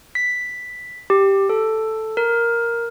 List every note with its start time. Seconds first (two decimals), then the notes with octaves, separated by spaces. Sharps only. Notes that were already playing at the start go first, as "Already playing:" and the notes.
0.15 B6
1.10 G4
1.49 A4
2.17 A#4